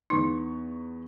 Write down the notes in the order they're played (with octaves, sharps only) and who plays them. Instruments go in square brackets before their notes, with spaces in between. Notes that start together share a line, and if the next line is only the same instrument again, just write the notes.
[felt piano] E2 B3 C#6 [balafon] D#4